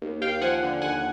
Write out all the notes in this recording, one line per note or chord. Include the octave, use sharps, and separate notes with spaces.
D#2
D#2 F5 G5
F3 F#5 G#5
D3
D#2 F#5 G#5